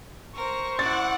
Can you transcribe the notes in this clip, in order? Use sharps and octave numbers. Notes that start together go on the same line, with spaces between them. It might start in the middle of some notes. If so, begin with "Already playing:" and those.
A#4 C5 C#6
E4 D5 F#5 A6